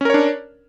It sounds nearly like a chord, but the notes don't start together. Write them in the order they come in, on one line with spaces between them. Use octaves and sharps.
C#4 A#4 C#5 D4